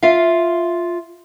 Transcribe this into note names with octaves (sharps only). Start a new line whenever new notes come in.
F4 E5 F5